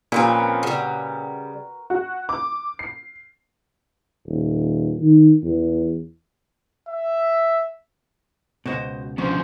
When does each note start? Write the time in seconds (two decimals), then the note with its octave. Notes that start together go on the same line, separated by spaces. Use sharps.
0.12 A#2 F3 C4 C#4 A#4 B4 G5
0.63 C#3 G3 F#4
1.90 F#4
2.29 D6
2.79 C7
4.27 D#1
5.00 D#3
5.44 E2
6.89 E5
8.66 C#2 B2 F#4 C5 D#5
9.18 D3 F3 B3 C#4 C5